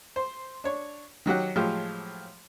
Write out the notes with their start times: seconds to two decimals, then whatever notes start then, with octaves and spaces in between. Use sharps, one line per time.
0.16 C5
0.64 D4 C#5
1.26 D#3 F#3 G4 F#5
1.56 A2 F3 F#3 G#3 F4 G4